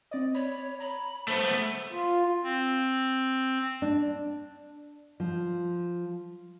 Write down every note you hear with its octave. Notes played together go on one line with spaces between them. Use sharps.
C4 D5 D#5
C#5 B5
A#5 B5
A3 B3 C5
F4
C4
D4
F3